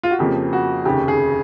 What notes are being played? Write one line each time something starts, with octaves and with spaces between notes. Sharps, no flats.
F4
F#4
F2 C#3 F3 A#3 G4
F#4
F1 D#2 C#3 G4
G#4